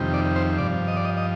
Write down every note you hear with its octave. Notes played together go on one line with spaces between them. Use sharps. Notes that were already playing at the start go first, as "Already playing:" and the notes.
Already playing: F2 C3 D#3 G3
D5
C5
G2 F3 D5
D#5
D5
D#5
D#5